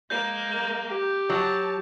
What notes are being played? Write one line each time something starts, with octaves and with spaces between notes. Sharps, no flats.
G#3 A#3 G6
G4
F#3 A5